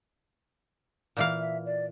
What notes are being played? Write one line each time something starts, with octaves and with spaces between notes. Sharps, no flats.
A#2 E3 F5
E5
D5